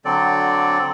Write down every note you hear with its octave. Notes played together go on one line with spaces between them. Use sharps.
D3 F#3 C4 A4 D5